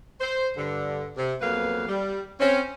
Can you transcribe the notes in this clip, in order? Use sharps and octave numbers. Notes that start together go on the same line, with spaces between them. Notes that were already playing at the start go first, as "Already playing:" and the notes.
C5
G2 D3
C3
F2 F#3 A#3 B3 B4 F5
G3
C4 C#4